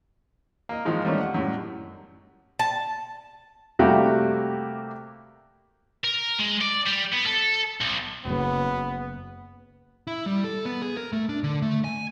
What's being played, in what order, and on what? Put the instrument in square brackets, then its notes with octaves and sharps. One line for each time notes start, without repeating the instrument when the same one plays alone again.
[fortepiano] A#3 D#5
G#2 D#3 F3 G#3 D#4
G3 A3 A#3 C#4
F#5
F#2 A2 G3
[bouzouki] A5
[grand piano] C3 G3 A3 A#3 F#4 G4
[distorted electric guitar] A#4
G#3
D5
G3
B3
A4
B1
[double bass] F#1 [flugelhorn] B3
[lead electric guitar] E4
G3
A4
B3
G#4
A#4
A3
D4
D3
A3
G#5